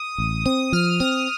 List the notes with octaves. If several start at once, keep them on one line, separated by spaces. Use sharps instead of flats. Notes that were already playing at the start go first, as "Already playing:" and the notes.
Already playing: D#6
A1
C4 D#6
F3 F6
C4 D#6